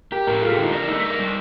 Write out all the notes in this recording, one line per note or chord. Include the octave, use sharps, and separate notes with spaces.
G4 A#4
A2 A#4
F4 A4
G4
D3
D#4
D4 A#4
A3 D#4
A#4
G3